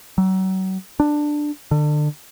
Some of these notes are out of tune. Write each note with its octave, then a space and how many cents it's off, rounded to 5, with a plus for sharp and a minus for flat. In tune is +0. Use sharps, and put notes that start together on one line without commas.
F#3 +35
D4 +10
D3 +30